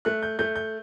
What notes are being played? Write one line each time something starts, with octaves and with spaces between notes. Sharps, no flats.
A3 F#6
G6
A3 G6
G6